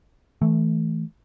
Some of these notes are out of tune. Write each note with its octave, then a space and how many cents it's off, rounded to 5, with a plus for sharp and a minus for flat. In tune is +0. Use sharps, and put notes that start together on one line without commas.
E3 -20 A3 +0